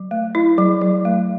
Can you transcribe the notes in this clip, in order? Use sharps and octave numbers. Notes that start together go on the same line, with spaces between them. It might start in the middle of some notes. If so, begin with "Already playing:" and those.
Already playing: F#3
A3
E4
F#3
F#3
A3